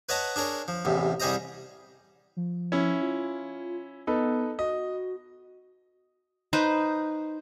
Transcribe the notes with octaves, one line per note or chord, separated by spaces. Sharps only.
B4 C#5 D#5 F#5 A5 A#5
D4 G#4 A#4 C#5
F3
A1 E2 C3
C2 G3 G#4 C5 D#5 A#5
F3
C#4 E4
F4
B3 D#4 A4 B4
F#4 D#5
D#4 B4 C5